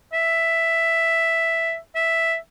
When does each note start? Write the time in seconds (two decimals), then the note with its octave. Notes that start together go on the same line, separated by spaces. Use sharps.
0.13 E5
1.95 E5